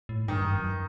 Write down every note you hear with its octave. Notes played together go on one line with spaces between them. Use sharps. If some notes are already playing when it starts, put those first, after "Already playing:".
A2
G2 D#3
G2
F#2